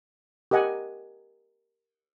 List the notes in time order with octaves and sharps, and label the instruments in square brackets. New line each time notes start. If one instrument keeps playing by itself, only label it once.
[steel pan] G4 A#4 D#5 F#5 G#5